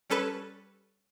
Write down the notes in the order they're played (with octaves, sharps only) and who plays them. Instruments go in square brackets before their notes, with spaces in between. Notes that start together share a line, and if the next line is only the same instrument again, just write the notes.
[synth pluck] G3 C#4 A4 B4